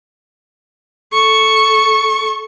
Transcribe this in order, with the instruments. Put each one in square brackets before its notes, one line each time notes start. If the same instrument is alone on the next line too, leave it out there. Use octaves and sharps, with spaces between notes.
[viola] A4 C#6